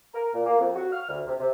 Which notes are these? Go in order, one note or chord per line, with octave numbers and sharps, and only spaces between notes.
A#4
A#2
A#3
F2
F#4
F6
D2
C3
C3